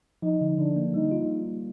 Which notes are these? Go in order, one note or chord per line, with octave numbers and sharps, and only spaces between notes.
F3 D#4
D3
D3 D4
A#3
G3 D#4
F4